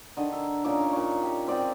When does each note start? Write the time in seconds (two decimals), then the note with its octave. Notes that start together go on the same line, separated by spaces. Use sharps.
0.17 D3 D#3 D#5
0.32 E5
0.64 A#2 C#4 D#4 D6
0.93 A#2 C#5
1.23 G4
1.47 C4 D5 D#5 G5